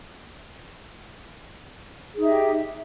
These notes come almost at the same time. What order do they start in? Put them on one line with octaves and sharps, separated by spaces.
G#4 D#4 E5 G4